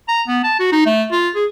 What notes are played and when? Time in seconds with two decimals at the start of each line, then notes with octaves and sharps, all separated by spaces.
0.08 A#5
0.28 B3
0.43 A5
0.59 F#4
0.72 D#4
0.86 A3
1.12 F4
1.35 G#4